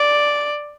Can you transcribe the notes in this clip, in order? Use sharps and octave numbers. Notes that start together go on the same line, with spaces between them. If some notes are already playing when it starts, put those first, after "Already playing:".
Already playing: D5